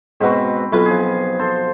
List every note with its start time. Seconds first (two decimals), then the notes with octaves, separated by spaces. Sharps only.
0.21 G#2 B2 C4 F#4 B4
0.72 B1 E4 F4 B4
0.86 F3 G#4
1.39 A4 C5 C6